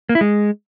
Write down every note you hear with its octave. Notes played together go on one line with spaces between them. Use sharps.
A#3
E4
G#3